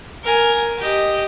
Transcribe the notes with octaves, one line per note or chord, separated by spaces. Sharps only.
A#4 G#5
G4 D#5